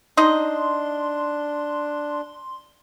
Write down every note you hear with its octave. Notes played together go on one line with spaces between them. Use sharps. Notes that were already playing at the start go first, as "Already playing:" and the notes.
D4 D#4 D#5 C6